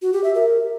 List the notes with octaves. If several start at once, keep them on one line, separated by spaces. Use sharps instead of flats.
F#4
G4
E5
A#4